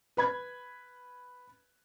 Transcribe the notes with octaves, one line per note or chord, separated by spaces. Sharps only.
B4 B5 G#6